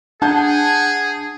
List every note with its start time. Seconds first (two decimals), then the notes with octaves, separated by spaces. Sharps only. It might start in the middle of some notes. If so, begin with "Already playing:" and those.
0.22 D4 G#4 F#5 A5 G6